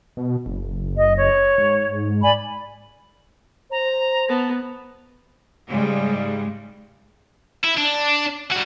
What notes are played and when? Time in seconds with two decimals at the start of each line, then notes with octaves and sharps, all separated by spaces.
0.17 B2
0.46 F#1
0.97 D#5
1.17 C#5
1.58 G#2
2.23 D5 G#5 B5
3.71 C5 A#5
4.29 B3 A5
5.69 G#2 C#3 G3 G#3
7.64 E4
7.77 D4
8.51 G3 F#4